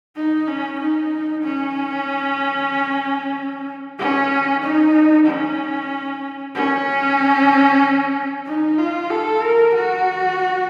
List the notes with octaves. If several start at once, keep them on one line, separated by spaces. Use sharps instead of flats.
D#4
C#4
D#4
C#4
C#4
D#4
C#4
C#4
D#4
F4
A4
A#4
F#4